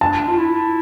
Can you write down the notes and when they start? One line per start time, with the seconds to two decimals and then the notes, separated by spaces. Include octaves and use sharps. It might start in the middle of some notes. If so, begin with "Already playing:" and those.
0.01 D4 A5
0.27 F4
0.37 E4